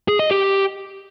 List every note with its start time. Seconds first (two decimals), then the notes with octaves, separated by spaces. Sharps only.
0.08 G#4
0.19 D#5
0.31 G4